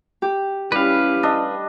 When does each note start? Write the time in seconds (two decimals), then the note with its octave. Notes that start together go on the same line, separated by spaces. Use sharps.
0.22 G4
0.72 G3 C#4 E4 B4 F5
1.23 D4 D#5